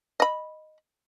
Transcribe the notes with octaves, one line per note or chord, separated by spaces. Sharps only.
D#5 B5